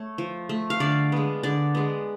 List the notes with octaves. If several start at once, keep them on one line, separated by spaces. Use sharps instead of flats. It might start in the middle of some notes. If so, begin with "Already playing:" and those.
Already playing: A3 C#5
F3
A3
F5
D3 D5
G#3 B3
D3 D5
G#3 B3